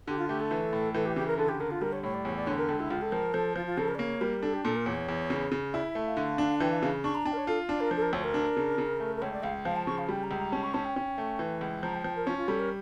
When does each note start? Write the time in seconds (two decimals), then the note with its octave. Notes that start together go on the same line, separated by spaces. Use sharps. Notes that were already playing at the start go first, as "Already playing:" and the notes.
0.07 D3 G4
0.18 F4
0.28 A3 G4
0.40 A4
0.51 E3
0.73 A2
0.94 E3 A4
1.05 G4
1.16 C#3 G4
1.27 A#4
1.38 D3 A4
1.49 G4
1.60 D3 A#4
1.71 F4
1.81 G3 A#4
1.92 C#5
2.03 A2 C#5
2.14 D5
2.25 E2 C#5
2.36 D5
2.47 D3 C#5
2.58 A#4
2.68 C#2 A4
2.80 E4
2.90 C#2 F4
3.01 A4
3.12 F3 A#4
3.33 F3 A4
3.55 F3 F4
3.66 F4
3.77 C#3 A4
3.88 A#4
3.95 D5
3.99 A#3 C#5
4.21 G3 A#4
4.42 D4 A4
4.54 G4
4.65 A#2 A4
4.75 A#4
4.86 E2 C#5
5.08 E2
5.30 C#3
5.52 C#3
5.73 E4 D5
5.84 E5
5.95 A3
6.06 F5
6.17 D3
6.38 D4
6.60 E3 G5
6.71 F5
6.82 C#3 F5
7.04 D4 C#6
7.15 A#5
7.25 D4 G5
7.32 A#4
7.37 C#5
7.47 F4 A4
7.69 D4 D5
7.81 A#4
7.91 F3
7.96 A4
8.02 A#4
8.13 D2 C#5
8.24 A#4
8.34 D4
8.56 C#3
8.78 C#3
9.00 A3
9.16 A#4
9.22 C#2 C#5
9.33 D5
9.43 C#2 F5
9.65 F3 F5
9.76 A5
9.86 C#3 C#6
9.98 F5
10.09 G3 G5
10.23 A#5
10.31 C#2
10.38 A#5
10.52 C#4 A5
10.63 C#6
10.74 C#4 A5
10.85 G5
10.96 C#4
11.18 A3
11.39 E3
11.61 C#2
11.83 F3 A#5
11.94 G5
12.04 F3 G5
12.16 A#4
12.26 C#4 F4
12.38 F4
12.48 G3 A4
12.59 A#4